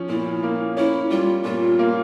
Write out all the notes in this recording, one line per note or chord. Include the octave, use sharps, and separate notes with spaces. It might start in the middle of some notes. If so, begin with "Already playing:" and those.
Already playing: F3 C#4
A#2 E4
A#3
C#4 E4
G3 F4
A#2 F4
A#3